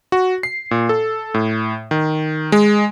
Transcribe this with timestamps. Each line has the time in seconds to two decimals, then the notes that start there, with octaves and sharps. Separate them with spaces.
0.12 F#4
0.43 C7
0.71 A#2
0.89 A4
1.34 A2
1.91 D#3
2.52 G#3